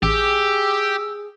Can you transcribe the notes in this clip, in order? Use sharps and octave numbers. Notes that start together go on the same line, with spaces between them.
A1 G4 G#4 E6